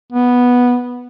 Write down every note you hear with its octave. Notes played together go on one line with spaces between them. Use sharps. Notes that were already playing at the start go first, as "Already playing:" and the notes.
B3